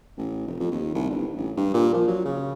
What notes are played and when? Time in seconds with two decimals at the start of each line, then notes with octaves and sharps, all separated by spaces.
0.18 A1
0.47 F1
0.60 F2
0.72 D#2
0.95 C2
1.10 G1
1.37 A1
1.57 G2
1.74 A#2
1.94 F3
2.08 F#3
2.25 C#3